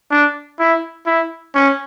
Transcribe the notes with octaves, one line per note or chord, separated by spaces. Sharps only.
D4
E4
E4
C#4